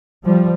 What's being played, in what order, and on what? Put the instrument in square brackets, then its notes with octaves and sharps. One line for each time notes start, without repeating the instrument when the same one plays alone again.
[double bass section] F3 G3